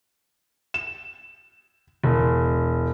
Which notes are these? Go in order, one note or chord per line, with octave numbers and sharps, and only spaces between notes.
E7
E1